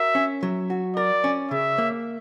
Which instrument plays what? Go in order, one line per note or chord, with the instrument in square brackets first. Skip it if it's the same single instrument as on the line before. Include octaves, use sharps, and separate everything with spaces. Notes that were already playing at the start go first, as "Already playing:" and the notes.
Already playing: [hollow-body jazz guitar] F#4 A#4 [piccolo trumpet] E5
[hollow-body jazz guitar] C#4
F#3
F#4
[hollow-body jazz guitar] A#4 [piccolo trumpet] D5
[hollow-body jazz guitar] C#4
[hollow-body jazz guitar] C#3 [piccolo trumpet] E5
[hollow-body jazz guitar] A#3